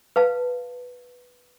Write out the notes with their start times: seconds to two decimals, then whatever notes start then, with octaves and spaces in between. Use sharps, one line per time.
0.16 B4 F5 A5